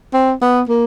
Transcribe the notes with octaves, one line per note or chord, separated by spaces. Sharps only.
C4
B3
A#3